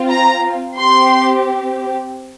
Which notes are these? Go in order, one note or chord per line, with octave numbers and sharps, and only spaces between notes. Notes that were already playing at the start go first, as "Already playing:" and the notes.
Already playing: C4 F4
A#5
C4 G4 C6